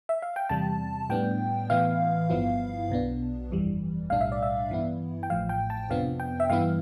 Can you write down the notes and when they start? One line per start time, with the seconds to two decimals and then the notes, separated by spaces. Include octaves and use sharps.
0.09 E5
0.22 F5
0.36 G5
0.49 E2 C3 G3 A5
1.10 A2 G3 B3 D4 G5
1.70 A2 E3 B3 E4 F5
2.30 G1 G2 F3 B3 E4
2.90 B1 B2 B3 D4
3.50 G1 F2 E3 G3
4.10 B1 A2 G3 D4 F5
4.21 E5
4.32 D5
4.43 E5
4.70 G2 E3 B3 E4
5.23 G5
5.30 A1 A2 F3 F5
5.49 G5
5.70 A5
5.90 F2 C3 F3 B3 D4 F5
6.20 G5
6.40 E5
6.50 G2 E3 B3 E4 F5